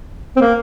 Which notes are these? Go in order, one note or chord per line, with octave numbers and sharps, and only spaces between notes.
C4
A#3